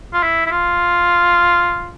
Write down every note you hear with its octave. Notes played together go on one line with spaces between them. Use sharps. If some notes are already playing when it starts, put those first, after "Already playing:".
F4
E4
E4
F4